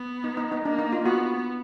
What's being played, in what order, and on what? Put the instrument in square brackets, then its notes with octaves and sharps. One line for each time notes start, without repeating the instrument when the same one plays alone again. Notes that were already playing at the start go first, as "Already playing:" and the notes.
Already playing: [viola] B3
[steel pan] D#4
D#4
D#4
[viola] A#3 [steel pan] D4
[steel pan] D#4
F4
[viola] B3 [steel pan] F#4